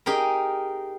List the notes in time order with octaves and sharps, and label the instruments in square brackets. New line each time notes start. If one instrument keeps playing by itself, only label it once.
[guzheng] D#4 G4 G#4 A#4